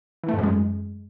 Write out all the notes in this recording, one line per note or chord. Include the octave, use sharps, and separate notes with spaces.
E3
A3
G#2
F#2
G#3